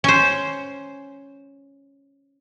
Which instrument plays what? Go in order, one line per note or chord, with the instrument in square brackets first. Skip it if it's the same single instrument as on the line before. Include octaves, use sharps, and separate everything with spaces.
[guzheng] C#4 C5